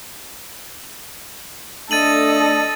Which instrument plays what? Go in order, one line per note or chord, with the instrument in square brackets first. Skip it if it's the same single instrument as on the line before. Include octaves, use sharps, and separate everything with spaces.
[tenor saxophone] A3 [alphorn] D4 [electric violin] A4 D#5 [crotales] A6 D#7 F#7